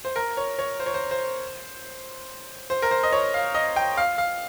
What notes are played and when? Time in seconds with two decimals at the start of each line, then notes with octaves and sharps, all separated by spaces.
0.05 C5
0.16 A#4
0.37 C#5
0.59 C#5
0.80 C5
0.86 C#5
0.94 C5
1.11 C5
2.70 C5
2.82 A#4
2.91 C5
3.03 D#5
3.12 C#5
3.34 F5
3.55 D#5
3.76 G5
3.97 F5
4.18 F5